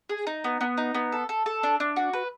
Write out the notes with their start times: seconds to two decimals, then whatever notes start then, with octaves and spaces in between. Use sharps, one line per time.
0.09 G#4
0.27 D#4
0.44 B3
0.61 B3
0.78 D#4
0.94 B3
1.12 A4
1.29 A4
1.46 A4
1.63 D4
1.80 D4
1.96 F#4
2.13 B4